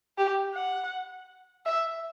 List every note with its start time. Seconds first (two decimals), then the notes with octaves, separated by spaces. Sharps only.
0.18 G4
0.55 F#5
1.66 E5